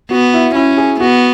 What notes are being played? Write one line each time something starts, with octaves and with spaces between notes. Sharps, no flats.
B3 F#4
E4
C#4 E4
G#4
B3 F#4